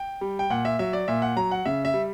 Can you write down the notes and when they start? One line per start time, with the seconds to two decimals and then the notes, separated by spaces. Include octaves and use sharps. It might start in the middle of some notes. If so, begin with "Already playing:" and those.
Already playing: G5
0.21 G3
0.39 G5
0.50 A#2 F#5
0.65 E5
0.79 F#3 E5
0.93 D5
1.08 A#2 E5
1.22 F#5
1.36 F#3 A#5
1.51 F#5
1.65 C#3 E5
1.85 E5
1.94 G3